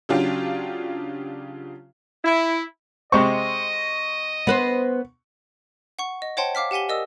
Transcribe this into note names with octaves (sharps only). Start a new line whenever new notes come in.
C#3 F#3 D4 F4 G4
E4
C3 G#3 C4 D#5 C#6
B3 B4 C5
F#5 C#6
D#5
C5 C#5 F#5 G5 A5 C6
F5 D6 F6 B6
G4 F#5 G#5 B6 G7
A#4 D5 D#5 D#6 E6